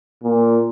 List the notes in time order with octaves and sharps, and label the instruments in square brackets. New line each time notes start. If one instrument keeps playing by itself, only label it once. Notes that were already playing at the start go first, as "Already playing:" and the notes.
[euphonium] A#2